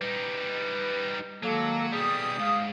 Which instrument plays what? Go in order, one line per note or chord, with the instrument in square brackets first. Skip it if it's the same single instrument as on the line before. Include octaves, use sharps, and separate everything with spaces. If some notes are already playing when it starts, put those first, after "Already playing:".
[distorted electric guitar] G3 D#4 [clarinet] B4
[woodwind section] D#3 G#3 A4 [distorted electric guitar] F#3 [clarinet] A#3
[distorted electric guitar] B1 G3 [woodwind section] G#4 D#6
[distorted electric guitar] G#2 [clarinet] F5